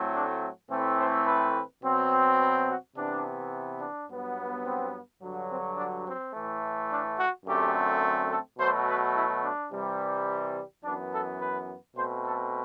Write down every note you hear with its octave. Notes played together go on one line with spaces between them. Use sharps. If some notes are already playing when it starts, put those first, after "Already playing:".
Already playing: A2 F#3 A3 C4
D4
A2 E3 A3 C4
C5
B4
B2 F#3 C4
B4
F#4
C3 E3 B3 D4
D4
G2 F#3 B3
C4
G2 D3 F#3
C4
D4
C4
A2 E3 A3
D4
F#4
F#2 D3 A3 C4 G4
A4
B2 F#3 A3 C5
B4
E4
D4
C3 E3 G3
F#2 E3 B3 D4
A4
B4
B2 A3 C4 C5
A4